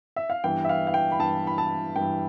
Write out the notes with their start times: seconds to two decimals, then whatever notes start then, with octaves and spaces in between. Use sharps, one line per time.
0.16 E5
0.30 F5
0.44 G2 E3 B3 G5
0.65 E5
0.69 F5
0.87 F5
0.94 G5
1.12 B5
1.19 G2 E3 B3 A5
1.47 B5
1.58 A5
1.96 G2 E3 B3 G5